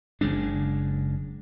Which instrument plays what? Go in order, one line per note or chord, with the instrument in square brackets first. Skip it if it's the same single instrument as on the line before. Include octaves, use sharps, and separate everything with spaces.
[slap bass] F#1 C#3 G#3 D4